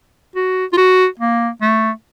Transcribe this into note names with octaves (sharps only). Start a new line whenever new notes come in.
F#4
F4
F#4
A#3
A3